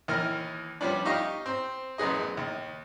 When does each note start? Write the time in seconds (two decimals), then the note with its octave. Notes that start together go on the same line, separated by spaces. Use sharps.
0.08 D#2 E3 A#4 F6
0.81 F3 G3 B3 C#4 D4
1.05 D#4 G4 D#5 F5 C#6
1.46 C4
1.98 A1 F#2 B3 G#4 D#5
2.37 D#2